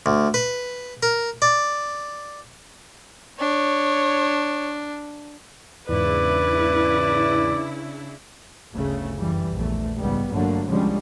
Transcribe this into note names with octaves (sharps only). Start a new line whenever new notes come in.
D2
B4
A#4
D5
D4 C#5
E2 G#2 C#3 D4 E4 B4 D5
G1 D2 C#3 A3
F#2 E3 G3
A#1 E2 A3
C#2 G#2 G3 B3
G1 G2 D3 F#3 A3 A#3
C2 D3 F3 G3 G#3 C#4